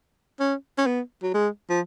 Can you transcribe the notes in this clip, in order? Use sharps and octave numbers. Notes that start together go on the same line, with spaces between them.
C#4
C#4
B3
F#3
G#3
F3